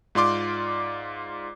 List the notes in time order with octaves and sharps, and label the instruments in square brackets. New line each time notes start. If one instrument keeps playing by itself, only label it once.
[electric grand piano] G#2 F4 D5 C6 D6